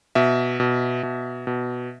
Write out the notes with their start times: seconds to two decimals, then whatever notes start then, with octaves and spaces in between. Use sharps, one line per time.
0.15 B2 E5
0.60 B2
1.03 B2
1.47 B2